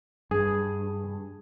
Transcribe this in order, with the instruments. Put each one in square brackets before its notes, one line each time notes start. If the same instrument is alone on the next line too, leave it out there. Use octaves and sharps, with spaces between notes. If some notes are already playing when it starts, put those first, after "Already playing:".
[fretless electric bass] G2 [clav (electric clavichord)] G#4